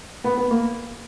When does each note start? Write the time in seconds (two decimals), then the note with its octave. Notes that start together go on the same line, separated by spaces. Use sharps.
0.24 B3
0.37 B3
0.51 A#3